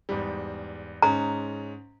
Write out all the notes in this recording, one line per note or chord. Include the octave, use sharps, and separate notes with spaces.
E2 G#2 G3
G#2 G#3 C#4 A#5